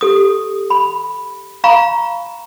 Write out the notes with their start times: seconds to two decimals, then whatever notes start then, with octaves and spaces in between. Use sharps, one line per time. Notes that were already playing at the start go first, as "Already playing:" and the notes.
0.01 G4 A4 D#6
0.70 B5
1.64 F5 A#5 B5 C#6